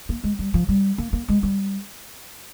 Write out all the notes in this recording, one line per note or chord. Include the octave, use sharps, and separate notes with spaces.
A#3
G#3
G3
F3
G3
A#3
A#3
G#3
G3